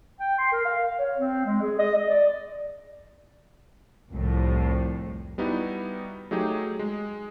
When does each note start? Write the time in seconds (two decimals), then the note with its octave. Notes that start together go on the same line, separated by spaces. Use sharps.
0.20 G5
0.38 C6
0.52 A#4
0.65 F5
0.85 F5
0.99 C#5
1.17 C4
1.46 G#3
1.62 G#4
1.79 D#5
1.96 D#5
2.09 D5
4.11 C2 F2 A2
5.38 G3 B3 D#4 E4 F#4
6.31 F#3 A3 D#4 G4 G#4
6.79 G#3